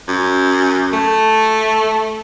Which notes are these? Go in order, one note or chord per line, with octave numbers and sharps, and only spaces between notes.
F#2
A3